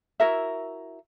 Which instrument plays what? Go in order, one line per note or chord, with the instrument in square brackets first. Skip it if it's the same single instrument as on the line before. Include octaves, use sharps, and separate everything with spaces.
[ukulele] E4 F#4 A#4 E5